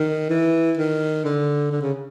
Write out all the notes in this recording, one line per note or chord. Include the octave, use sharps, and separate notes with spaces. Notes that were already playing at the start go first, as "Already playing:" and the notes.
Already playing: D#3
E3
D#3
D3
D3
C#3